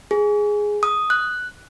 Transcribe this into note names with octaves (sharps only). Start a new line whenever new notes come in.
G#4
D#6
F#6